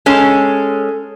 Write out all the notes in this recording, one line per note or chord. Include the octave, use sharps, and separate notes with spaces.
G#3 C#4 A4